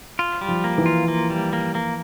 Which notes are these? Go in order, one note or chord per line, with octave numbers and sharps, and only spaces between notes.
F4
G3
F3
A#3
E3
F4
A#3
G3
A#3
A#3